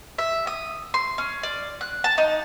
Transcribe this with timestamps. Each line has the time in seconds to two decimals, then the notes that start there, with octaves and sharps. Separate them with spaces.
0.18 E5
0.47 D#6
0.94 C6
1.18 C#4
1.43 D5
1.81 F#6
2.04 A5
2.18 D#4